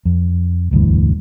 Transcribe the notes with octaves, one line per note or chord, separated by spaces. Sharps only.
F2
E1 D2 G2 E3